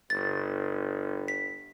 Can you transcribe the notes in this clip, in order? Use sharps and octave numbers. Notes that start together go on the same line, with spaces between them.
G1 A6
B6